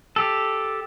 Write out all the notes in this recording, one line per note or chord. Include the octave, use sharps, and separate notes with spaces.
G4 A4